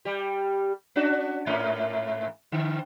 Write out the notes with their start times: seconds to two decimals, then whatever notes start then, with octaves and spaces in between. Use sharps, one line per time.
0.05 G3 G4
0.96 C#4 D4 F#4
1.46 G#2 A#3 C#4
2.52 D3